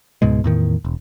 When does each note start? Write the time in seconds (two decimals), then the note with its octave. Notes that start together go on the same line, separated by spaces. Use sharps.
0.22 C#2 G#2 B2 G#3
0.44 E2 A2 D#3
0.85 E1